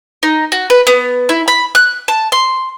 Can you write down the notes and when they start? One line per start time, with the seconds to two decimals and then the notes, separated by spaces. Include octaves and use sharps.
0.23 D#4
0.52 F#4
0.70 B4
0.87 B3
1.29 E4
1.48 B5
1.75 F#6
2.08 A5
2.32 C6